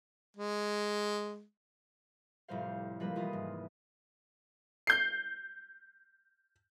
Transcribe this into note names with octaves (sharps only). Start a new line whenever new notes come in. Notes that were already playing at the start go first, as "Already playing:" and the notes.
G#3
F1 A2 G3 C5 F5
F3 G3 G#3 A#3 B4
F1 E3 F4 D#6
G#2
G6 C7